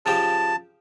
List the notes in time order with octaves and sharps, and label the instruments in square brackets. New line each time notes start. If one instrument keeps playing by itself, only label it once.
[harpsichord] C#3 F3 G4 [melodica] A5